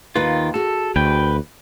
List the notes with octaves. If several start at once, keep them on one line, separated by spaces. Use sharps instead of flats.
D#2 D#3 F4 B4
F#4 G#4 A4
D2 B4 G5